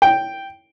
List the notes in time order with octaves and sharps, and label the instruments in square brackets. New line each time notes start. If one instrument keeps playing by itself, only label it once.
[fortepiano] G5